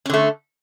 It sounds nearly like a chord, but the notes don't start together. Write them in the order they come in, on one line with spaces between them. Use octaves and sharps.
C#4 D3 A3